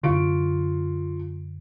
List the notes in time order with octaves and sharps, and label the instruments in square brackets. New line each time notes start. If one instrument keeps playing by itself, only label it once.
[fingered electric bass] F#2 D3 [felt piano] F4 C#6 D7